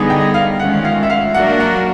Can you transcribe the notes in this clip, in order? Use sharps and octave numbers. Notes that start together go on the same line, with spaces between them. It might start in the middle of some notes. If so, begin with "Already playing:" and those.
Already playing: D3 G3 B3 D#4 G#4
G5
F5
D#3 G#3 C#4 F4 F#5
F5
E5
F5
F#3 A#3 D4 F#4 A#4 F#5
F#5